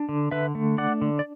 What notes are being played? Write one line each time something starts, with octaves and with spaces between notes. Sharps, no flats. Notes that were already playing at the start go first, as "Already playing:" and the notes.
Already playing: D4
D3
D3 B4 E5
A3
D4 D5 F#5
D3
D5